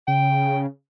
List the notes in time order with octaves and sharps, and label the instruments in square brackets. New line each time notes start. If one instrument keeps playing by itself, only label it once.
[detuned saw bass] C#3 [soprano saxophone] G5